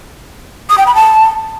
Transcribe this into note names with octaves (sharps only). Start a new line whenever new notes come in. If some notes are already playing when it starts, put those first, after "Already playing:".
D#6
G5
B5
A5